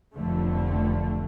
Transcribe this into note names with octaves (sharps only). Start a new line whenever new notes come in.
F1 B1 F2 D3 A3